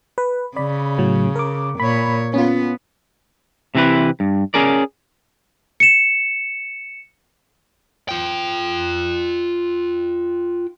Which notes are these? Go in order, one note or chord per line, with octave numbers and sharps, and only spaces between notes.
B4
C#3 D5 B5
A2 F#3
A#4 D6
A#2 C#5 B5
B3 C#4 F4
C3 E3 C4 E4 B4
G2
C#4 G#4 A#4 D5
C#7 E7
F4 G5